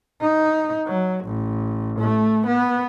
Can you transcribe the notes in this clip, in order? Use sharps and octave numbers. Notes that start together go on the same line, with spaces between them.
D#4
F#3
A1
A3
B3